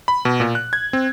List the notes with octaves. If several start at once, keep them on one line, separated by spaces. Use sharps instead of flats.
B5
B2
A#2
F#6
G#6
C4